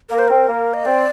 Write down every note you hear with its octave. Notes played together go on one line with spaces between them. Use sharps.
A#3 A#4
C5
C4 A#4
A#3
D#5
C4 D5